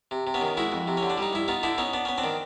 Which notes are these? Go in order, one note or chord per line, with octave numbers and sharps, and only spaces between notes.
C3
C3
B3 C#4
D#3
G#3 E4 F#4
F2
C3
C#4
D3
D4
G3 D#4
G2 E4
B3 D#4 F4
D3 D4 E4
B3 C#4 D#4
B3 D4
B3 C#4
C4 D4
D#3